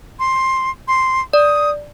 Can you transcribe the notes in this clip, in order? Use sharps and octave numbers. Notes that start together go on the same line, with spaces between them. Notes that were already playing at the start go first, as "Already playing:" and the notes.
C6
C6
D5 D#6